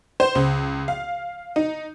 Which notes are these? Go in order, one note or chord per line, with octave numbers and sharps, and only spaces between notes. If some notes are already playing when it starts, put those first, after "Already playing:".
C5
C#2
F5
D#4